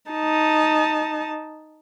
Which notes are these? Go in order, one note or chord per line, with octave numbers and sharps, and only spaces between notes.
D#4 A5